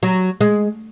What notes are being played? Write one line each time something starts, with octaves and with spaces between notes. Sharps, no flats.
F#3
G#3